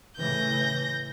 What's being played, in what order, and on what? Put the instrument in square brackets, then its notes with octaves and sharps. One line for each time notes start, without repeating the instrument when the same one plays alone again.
[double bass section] A2 C#3 E3 [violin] G6 A#6